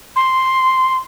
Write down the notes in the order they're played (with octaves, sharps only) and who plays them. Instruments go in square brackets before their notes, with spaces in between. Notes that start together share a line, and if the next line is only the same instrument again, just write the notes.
[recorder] C6